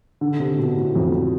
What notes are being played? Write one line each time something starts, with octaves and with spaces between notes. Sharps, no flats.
D3
C3
B2
A2
F2